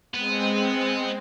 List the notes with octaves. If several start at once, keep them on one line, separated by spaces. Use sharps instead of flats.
G#3 B3 C4 B4